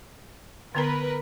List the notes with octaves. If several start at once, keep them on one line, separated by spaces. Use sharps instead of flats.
D3 B3 A#4 B4 A#5